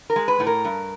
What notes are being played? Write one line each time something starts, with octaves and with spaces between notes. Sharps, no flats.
A#4
G#3
B4
A2
A#4
G2